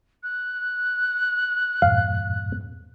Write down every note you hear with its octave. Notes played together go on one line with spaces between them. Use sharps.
F#6
E2 G2 A#2 F5